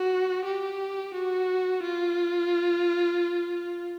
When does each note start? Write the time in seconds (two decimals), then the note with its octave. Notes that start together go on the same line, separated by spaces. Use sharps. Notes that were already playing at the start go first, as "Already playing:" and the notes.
Already playing: F#4
0.45 G4
1.14 F#4
1.83 F4